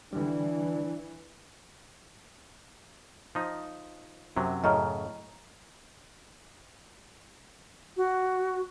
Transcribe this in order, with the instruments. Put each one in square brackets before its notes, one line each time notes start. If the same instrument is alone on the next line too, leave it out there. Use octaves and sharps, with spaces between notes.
[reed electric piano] D3 G3 [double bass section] E3 [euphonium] D4
[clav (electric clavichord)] F3 D#4
F#2 C3 F#3
[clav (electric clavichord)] F#2 A2 C#3 [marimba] D#5 A#5 F6
[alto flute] F#4